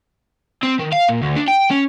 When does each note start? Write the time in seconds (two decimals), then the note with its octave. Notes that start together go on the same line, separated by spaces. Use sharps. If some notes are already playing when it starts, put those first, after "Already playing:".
0.63 C4
0.79 D#3
0.93 F5
1.09 A#2
1.22 D2
1.36 D4
1.48 G5
1.71 C#4